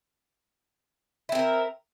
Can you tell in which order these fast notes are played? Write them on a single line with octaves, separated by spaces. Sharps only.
E4 C4 A#4